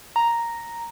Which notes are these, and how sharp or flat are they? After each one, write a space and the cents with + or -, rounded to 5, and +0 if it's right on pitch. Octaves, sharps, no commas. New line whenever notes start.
A#5 +0